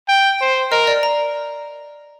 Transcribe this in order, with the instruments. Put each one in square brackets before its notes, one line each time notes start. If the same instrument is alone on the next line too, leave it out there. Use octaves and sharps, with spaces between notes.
[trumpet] G5
C5
[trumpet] A#4 [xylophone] D#5
[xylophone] D5
A#5